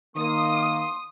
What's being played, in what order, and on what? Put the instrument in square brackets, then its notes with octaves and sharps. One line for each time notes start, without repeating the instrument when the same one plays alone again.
[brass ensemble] D#3 A#3 [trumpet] C6 [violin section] D#6